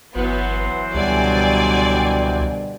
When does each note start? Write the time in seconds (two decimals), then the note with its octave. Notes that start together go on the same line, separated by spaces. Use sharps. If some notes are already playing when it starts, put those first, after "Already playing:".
0.15 G1 E3 F#3 B3 C5
0.94 C#2 B2 D3 G3 D5 G#5